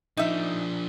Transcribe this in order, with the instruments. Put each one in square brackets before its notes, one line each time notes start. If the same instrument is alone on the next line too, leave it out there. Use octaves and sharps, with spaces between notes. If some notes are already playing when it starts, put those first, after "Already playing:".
[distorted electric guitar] F3 D4 [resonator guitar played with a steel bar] D#4 E5